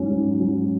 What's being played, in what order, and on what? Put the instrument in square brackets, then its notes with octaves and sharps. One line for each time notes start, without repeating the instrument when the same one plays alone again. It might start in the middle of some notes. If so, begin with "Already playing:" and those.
Already playing: [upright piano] G#2 F#3 C#4
G#2
F#3 C#4